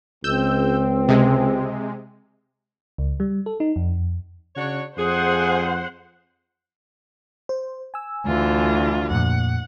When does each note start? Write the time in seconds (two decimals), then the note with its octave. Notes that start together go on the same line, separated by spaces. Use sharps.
0.24 C#2 C4 E6 G6
1.08 C3 G#3
2.98 C#2
3.20 G3
3.46 A4
3.60 D#4
3.76 F2
4.56 C#3 D4 F#4 C#5
4.97 F2 G#4 C5 F#5
7.49 C5
7.94 G#5 E6
8.27 D2 E3 F4
9.11 F2 A#2 F#5